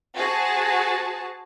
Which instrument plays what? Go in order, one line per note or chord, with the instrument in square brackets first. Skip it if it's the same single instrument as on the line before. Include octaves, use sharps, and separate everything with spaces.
[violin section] F#4 G#4 C5 A5